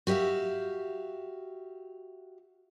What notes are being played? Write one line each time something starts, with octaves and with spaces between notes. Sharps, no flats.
F#4 G4 B4 E5 F5